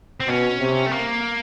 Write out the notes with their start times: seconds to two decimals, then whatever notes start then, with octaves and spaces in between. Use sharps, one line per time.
0.20 C4
0.27 B2 C#4
0.60 C3
0.86 A3
0.92 A#3